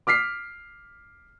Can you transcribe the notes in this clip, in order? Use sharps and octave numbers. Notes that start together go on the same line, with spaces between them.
D6 F6 B6 C7